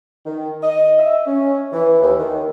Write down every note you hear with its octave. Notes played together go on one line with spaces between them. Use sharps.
D#3
D#5
E5
C#4
E3
D#2
D#3